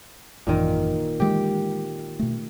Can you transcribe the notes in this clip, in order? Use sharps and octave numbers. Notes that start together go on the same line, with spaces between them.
G#1 F#2 A#2 D#3 E3
D#3 E3 G#3 G4
B2 A3